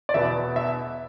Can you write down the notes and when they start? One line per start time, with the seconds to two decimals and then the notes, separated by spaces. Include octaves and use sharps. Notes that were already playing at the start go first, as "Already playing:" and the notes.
0.09 D5
0.14 E2 B2 B3 E5
0.56 E5